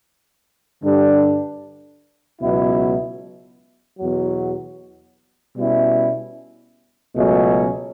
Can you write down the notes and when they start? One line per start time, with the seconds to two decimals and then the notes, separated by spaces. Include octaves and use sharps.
0.83 G2 D3 G3 D4
2.41 C#2 B2 F#3 B3 E4
3.99 E2 B2 F#3
5.57 B2 G3 C#4 E4
7.15 C#2 B2 F#3 A3 C#4